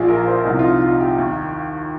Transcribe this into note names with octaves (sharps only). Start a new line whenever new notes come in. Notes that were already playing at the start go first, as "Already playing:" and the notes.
Already playing: A#1 A#2 F3 F4 G#4
A#4
C5
C2 C3 F3 D#4
F4
D#4
F4
G4
D#2 D#3